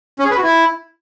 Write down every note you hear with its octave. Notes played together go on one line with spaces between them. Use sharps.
C#4
G#4
B4
F#4
E4